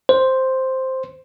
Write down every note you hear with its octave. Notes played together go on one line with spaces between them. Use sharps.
C5